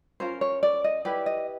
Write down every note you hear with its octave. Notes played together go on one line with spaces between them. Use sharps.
C#4 F4 A#4 C5
C#5
D5
D#5
E4 G4 B4 D5
D#5